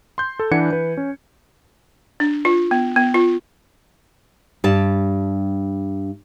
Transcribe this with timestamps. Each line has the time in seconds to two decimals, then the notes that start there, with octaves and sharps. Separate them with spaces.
0.18 C6 G6
0.39 A4
0.51 E3 D4 B4 F#5 G#6 C#7
0.71 E3 B4
0.97 C#4
2.20 D4
2.45 F4
2.71 B3
2.96 B3
3.14 F4
4.64 G2 G3 A5